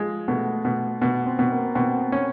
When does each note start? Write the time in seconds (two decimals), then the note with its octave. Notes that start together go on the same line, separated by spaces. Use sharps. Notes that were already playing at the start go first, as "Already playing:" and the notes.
Already playing: F3 G#3
0.28 B2 A3
0.65 B2
1.01 B2 B3
1.26 C4
1.39 B2
1.51 A#3
1.75 B2 C4
2.12 C#4